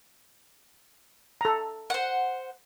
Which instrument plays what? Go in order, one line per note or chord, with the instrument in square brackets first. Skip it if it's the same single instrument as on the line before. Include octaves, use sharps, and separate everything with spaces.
[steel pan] A4 A#5
[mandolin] C5 F#5